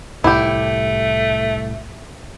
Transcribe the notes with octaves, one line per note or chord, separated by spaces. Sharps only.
C2 A2 A3 E4 G4